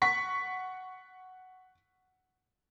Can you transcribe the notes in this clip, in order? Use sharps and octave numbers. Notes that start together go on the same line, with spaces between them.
F#5 C#6 B6